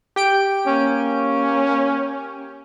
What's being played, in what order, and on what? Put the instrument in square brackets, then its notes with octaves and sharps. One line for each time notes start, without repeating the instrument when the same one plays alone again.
[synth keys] G4 G5 D7
[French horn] A#3 [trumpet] C#4